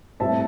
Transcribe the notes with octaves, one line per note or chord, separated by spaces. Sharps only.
A2 G3 C4 E5 A5